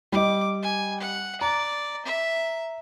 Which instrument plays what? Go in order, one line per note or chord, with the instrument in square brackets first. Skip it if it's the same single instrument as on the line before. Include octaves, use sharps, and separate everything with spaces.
[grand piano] G3 D#5 [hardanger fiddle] D6
[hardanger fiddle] G#5
F#5
[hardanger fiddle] D5 [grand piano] A#5
[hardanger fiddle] E5